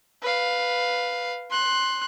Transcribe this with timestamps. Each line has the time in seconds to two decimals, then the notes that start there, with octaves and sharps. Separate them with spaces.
0.23 B4 F5
1.51 C6 F#6